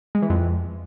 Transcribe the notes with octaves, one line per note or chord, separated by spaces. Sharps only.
G#3
E3
F2